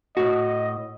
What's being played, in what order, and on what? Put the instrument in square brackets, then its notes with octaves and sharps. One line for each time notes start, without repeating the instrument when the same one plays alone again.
[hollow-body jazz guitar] A2 F#4 [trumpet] D#5